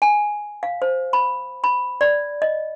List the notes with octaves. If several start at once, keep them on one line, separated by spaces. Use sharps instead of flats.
G#5
F5
C5
B5
B5
D5
D#5